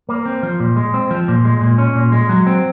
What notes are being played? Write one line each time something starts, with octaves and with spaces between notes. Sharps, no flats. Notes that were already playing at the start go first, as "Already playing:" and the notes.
A#3
C4
F3
A#2
G#3
C4
F3
A#2
G#3
A#2
C#4
A#2
G#3
F#3
C4